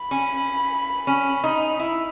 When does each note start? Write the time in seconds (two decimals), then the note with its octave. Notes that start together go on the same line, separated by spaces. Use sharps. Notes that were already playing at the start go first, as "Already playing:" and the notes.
Already playing: B5
0.11 C#4
1.07 C#4
1.44 D#4
1.80 E4